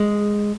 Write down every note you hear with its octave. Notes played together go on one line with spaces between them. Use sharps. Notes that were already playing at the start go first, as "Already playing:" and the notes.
Already playing: G#3